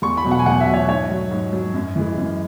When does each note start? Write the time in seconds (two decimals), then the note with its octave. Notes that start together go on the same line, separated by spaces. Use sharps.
0.02 E2 C#6
0.17 B5
0.24 B2 F#3
0.31 F#5
0.39 G#5
0.46 E2 F#5
0.60 E5
0.67 B2 F#3
0.74 C#5
0.88 G#2 C#5
1.10 F#3
1.31 G#2
1.53 F#3
1.74 F#2
1.96 E3 G#3
2.18 F#2